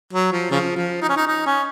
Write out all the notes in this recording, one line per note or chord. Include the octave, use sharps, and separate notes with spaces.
F#3
F3
C#3 F3
F3
D#4
C#4
D#4
D#4
C#4